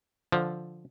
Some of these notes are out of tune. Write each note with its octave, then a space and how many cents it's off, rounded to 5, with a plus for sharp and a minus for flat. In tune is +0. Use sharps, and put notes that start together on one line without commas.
D3 +0 F3 +0